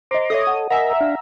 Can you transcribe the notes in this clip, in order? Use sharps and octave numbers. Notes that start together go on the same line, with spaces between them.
C5 D#5 A#5 C6 D6
A4 C#5 D#5 E5 D#6
A4 F#5
A#4 D#5 E5 F#5 G#5 A#5
D4 F5